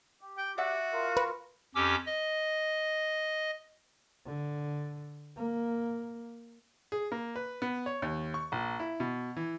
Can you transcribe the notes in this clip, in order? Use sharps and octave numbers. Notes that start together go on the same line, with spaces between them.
G4
G5
F#4 D5 E5 F#5
F4 A#4 F5
B4
F2 C#4 G4 D6 E6
D#5
D3
A#3
G#4
A#3
B4
B3
C#5
D#2
C#6
A#1
E4
B2
E3